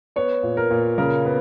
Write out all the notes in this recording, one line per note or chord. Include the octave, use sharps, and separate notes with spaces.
B3 C#5
A#2
A#4
A#2
C#3 A#4
B3